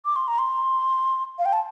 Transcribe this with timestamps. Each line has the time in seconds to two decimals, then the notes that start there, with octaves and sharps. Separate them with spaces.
0.05 D6
0.16 C6
0.28 A#5
0.39 C6
1.39 F5
1.45 G5
1.53 A5